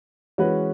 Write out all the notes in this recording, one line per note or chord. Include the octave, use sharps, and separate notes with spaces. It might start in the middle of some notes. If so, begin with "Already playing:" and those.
E3 G#3 C#4 F#4 B4